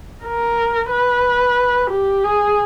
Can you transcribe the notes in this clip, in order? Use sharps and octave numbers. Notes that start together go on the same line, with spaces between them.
A#4
B4
G4
G#4